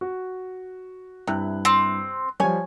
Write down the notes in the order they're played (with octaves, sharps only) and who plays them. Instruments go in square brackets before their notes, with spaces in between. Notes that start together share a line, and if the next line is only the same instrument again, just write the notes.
[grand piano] F#4
[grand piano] G2 E4 F#6 [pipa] C3
[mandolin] C4
[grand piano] F3 G3 [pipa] C#5 G#5